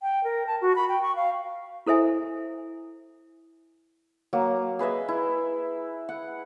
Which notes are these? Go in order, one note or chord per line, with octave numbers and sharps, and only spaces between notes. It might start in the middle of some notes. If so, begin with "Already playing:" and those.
G5
A#4
A5
F#4
B5
G5
C#6
F5
E4 A4 C5 E5 G#5
F#3 A#3
G#4 B4 D#5 E5
E4
F#5